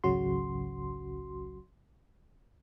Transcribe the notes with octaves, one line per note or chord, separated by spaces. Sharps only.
G#1 C#2 C#3 F#3 F#4 C6